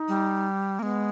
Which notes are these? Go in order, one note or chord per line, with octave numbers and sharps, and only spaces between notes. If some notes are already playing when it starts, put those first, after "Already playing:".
Already playing: D#4
G3
G#3 A#3 B3